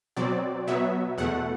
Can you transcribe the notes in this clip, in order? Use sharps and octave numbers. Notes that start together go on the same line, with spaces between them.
B2 F#3 C4 D5
B2 F#3 B3 E5
E2 B2 A3 F#5